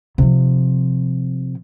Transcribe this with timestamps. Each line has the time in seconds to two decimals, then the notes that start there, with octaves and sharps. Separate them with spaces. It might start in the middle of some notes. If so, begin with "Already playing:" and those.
0.18 C3 F3